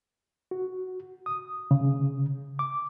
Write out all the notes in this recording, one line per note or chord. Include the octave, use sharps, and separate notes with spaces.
F#4
D#6
C#3
D6